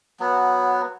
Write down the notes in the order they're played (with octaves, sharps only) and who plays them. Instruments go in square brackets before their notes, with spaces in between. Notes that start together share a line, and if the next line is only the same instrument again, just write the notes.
[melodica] F#3 B3